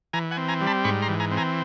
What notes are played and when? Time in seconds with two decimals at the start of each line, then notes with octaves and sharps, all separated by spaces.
0.13 E3 G#5 A#5
0.31 F#5 G#5
0.37 C4
0.49 G#5 A#5
0.61 G3
0.67 A5 B5
0.84 G#2 B5 C#6
1.02 A#5 C6
1.09 E3
1.20 G#5 A#5
1.31 C4
1.37 G#5 A#5